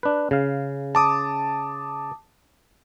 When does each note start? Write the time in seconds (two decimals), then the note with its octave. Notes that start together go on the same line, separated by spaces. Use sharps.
0.03 D4 B4
0.31 C#3 F5
0.95 A5 D6 D#6